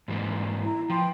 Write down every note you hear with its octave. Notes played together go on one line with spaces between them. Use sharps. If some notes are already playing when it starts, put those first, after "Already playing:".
G#2 E3 A#3
E4 A#5
F3 B4 G5 C6